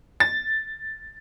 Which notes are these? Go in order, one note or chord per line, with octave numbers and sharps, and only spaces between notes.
A6